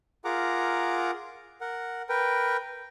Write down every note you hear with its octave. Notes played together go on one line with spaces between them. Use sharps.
F4 G#4 A#4 F#5 A#5 D6
A#4 F#5
A#4 B4 G5